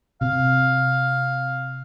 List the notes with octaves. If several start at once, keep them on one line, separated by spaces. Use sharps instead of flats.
C3 F5